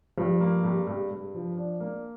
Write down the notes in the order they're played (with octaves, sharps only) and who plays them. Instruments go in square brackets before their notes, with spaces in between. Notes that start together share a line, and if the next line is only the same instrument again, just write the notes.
[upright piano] G2 [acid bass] F3
[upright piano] A#3
G2
G2
G2
F3
D4
A#3